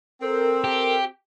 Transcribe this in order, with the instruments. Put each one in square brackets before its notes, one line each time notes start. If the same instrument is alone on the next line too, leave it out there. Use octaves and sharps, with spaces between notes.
[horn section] C4 [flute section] A4 A#4
[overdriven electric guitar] G4